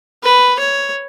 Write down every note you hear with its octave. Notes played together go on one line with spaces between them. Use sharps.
B4
C#5